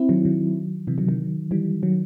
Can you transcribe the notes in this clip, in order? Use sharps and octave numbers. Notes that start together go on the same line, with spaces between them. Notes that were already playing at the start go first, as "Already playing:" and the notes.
Already playing: C4 E4
D#3 F#3
D#3 F#3
C3 E3
D#3 F#3
D#3 F#3
E3 G3
D#3 F#3